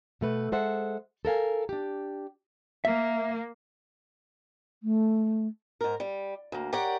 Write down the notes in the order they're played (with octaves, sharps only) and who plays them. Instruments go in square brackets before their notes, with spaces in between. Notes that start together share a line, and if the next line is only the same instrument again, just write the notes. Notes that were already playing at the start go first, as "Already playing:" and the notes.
[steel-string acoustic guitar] B2 A3 B4
G#3 A4 C5 E5 F#5
A4 A#4 F5 G#5
D4 G4
[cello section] A#3 [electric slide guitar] E5
[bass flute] A3
[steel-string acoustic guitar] G#2 A#4
G3
D2 A#3
G4 A#4 C#5 D5 F#5